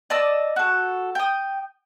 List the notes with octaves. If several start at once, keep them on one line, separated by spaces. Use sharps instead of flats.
D5 D#5 A5 E6
F#4 A4
G5 D#6